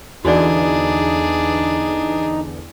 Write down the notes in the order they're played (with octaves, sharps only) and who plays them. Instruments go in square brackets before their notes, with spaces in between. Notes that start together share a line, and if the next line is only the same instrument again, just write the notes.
[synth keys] E2 D3 E3 [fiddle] D4 G#4 [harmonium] D#4 [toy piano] F#4 D5